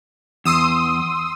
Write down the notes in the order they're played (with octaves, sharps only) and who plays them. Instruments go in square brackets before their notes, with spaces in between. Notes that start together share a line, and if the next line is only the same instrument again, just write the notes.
[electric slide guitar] E2 [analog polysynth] C6 D#6 E6